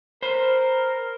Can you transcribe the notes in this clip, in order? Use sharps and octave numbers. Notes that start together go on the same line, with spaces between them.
A#4 C5 B5